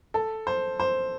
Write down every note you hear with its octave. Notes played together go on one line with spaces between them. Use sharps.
A4
C5
C5